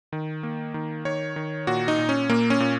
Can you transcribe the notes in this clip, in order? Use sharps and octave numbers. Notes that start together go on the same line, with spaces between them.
D#3
A#3
D#3
D#3 C#5
D#3
A#2 F#4
D#4
A#2
C#4
A#2 A#3
C#4
A#2